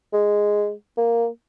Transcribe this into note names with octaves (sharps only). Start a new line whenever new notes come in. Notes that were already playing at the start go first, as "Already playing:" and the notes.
G#3
A#3